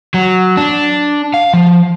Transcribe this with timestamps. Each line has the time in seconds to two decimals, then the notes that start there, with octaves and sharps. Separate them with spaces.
0.14 F#3
0.57 D4
1.34 F5
1.54 F3